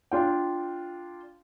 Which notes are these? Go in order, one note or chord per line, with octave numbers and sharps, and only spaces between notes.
D4 F4 G5